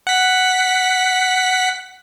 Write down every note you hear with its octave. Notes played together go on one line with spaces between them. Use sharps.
F#5 B6